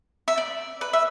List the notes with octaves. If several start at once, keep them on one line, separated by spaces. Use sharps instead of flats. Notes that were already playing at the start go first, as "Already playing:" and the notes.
E5
D5
B4
E5